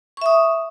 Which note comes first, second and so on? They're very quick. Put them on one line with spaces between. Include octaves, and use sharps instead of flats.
C#6 E5 D#6